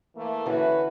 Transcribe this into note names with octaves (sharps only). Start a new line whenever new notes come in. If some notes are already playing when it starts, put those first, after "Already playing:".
E3 A3 A#3
D3 E3 C#4 F#4 B4